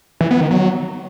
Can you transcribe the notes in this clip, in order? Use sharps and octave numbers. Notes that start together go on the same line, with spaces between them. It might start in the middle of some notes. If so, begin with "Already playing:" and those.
E3
B3
D#3
F#3